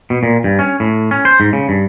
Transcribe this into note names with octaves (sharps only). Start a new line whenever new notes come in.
B2
A#2
G2
C#4
A2
C#4
C5
G#2
C#3
G2